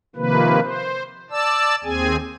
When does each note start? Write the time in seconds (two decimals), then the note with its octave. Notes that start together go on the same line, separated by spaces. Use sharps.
0.16 C3 D#3 F3 A#3 B4
0.61 C5
1.30 D5 A5 E6
1.84 D#2 C4 G#4 G#5